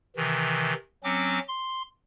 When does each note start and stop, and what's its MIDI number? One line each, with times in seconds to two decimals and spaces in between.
0.16 0.73 48
0.16 0.73 51
0.16 0.73 52
1.04 1.39 54
1.04 1.39 60
1.04 1.39 61
1.04 1.39 86
1.48 1.83 84